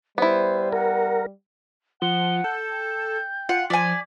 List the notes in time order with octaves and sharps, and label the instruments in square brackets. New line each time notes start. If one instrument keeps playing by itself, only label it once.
[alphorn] G3 [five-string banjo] B3 E4 [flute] C5
[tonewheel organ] A#4 [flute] F#5
[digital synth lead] F3 [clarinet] F#5 [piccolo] G7
[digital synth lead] A4 [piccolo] G6
[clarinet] G5
[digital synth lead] F4 [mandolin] F#5
[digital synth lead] F3 [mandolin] D5 G#5 [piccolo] B6